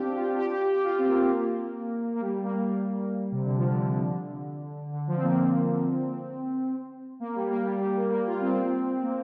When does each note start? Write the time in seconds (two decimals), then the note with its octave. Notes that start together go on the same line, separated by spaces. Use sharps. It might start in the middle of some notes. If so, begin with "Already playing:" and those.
Already playing: C4 D4 F4 G4
0.16 F4
0.38 G4
0.50 G4
0.61 G4
0.73 G4
0.84 F4
0.98 C4
1.07 A#3
2.15 A#3
2.20 G3
2.43 A#3
2.65 G3
3.32 C3
3.44 D3
3.56 F3
3.71 D3
3.86 D3
4.92 D3
5.07 F3
5.16 C4
5.23 A#3
5.38 C4
7.20 A#3
7.35 G3
7.50 A#3
7.65 G3
7.80 G3
7.96 A#3
8.10 A#3
8.26 F4
8.41 C4
9.02 A#3